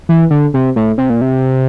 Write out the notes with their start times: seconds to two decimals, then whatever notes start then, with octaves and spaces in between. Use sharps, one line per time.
0.09 E3
0.30 D3
0.54 C3
0.76 A2
0.98 C3
1.10 A#2
1.21 C3